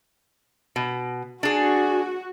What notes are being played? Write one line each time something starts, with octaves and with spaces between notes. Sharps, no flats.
B2
D4 F#4 G#4